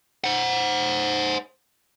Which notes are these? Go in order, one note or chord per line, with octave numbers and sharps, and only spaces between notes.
C5 F#5